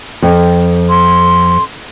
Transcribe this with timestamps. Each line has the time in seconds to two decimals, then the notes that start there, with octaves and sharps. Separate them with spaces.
0.22 F2
0.90 C6